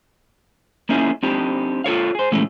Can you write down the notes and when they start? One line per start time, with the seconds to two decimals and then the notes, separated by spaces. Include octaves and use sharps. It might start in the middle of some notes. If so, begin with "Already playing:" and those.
0.89 A#3 C#4 D#4 E4 G#4
1.23 C4 D4 D#4 G4
1.84 F4 A4 C#5 F5
2.15 G#4 C5
2.32 A#2 E3 G#3 A3 C#4